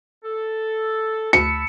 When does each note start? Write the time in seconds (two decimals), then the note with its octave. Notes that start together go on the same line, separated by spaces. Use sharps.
0.24 A4
1.33 D2 A5 B5 E6 C#7